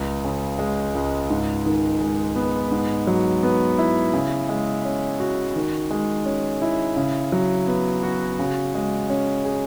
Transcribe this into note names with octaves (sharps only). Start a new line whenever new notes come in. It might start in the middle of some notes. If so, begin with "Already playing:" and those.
Already playing: C#2
C#3
G#3
C#2
G#2
D#3
G#3
B3
G#2
F#3
B3
E4
C#3
G#3
C#4
F#4
D#3
G#3
C#4
E4
C#3
F#3
B3
F#4
C#3
G#3
C#4
G#4